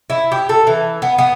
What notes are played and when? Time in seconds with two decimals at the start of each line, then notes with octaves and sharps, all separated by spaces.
0.10 E4
0.32 G4
0.49 A4
0.67 E3
1.02 B3
1.18 B3